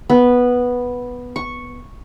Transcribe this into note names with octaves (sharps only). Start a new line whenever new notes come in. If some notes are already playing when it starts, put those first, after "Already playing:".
B3
C#6